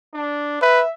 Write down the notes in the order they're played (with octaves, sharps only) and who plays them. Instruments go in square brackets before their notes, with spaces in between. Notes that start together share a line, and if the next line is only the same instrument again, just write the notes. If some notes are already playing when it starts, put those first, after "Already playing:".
[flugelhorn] D4
[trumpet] B4 [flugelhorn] E5